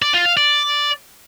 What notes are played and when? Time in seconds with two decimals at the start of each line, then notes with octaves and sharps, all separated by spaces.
0.02 D5
0.14 F4
0.25 F5
0.37 D5